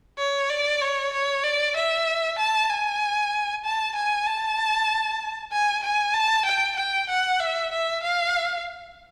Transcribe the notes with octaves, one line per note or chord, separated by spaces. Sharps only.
C#5
D5
C#5
C#5
D5
E5
A5
G#5
A5
G#5
A5
G#5
G#5
A5
G5
G5
F#5
E5
E5
F5